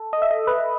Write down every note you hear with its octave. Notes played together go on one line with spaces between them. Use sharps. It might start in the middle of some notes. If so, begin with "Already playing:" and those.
Already playing: A4
D#5
E5
D#5
B4